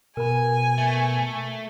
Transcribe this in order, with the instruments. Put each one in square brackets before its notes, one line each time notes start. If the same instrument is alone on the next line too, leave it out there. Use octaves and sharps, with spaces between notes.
[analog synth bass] B2 [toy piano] A#4 B5 [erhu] G#5
[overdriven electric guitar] A3